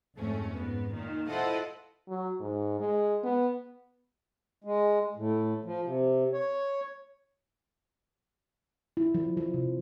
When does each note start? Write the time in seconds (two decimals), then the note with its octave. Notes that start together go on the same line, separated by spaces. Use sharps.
0.18 F2 G#2 A3 C#4
0.54 G#2 B3
0.94 A#2 D#3
1.28 E4 F4 A4 C5 D#5 F#5
2.08 F#3
2.40 G#2
2.80 G#3
3.24 B3
4.64 G#3
5.16 A2
5.65 F3
5.85 C3
6.33 C#5
8.97 E4
9.14 F3
9.37 F3
9.54 C3